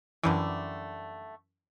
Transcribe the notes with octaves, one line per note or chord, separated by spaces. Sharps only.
F#2 D3 E3 G3 A3